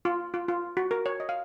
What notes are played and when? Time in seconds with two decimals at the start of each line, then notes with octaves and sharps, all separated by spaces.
0.05 F4
0.34 F4
0.48 F4
0.77 F#4
0.91 A#4
1.06 C#5
1.20 D#5
1.29 F5